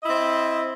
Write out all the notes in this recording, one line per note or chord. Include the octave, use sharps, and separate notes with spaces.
C4 E4 C5 D#5